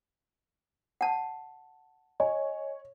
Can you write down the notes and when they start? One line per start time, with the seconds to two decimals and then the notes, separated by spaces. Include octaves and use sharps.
1.01 F#5 A5
2.20 C#5 D#5 G#5